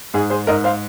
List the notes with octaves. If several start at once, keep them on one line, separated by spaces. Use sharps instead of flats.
G#2 G#4
G#4 C5
G#2 A#4 D#5
C5 F5